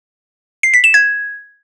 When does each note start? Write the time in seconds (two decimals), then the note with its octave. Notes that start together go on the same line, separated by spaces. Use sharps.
0.63 C7
0.74 B6
0.84 E7
0.94 G#6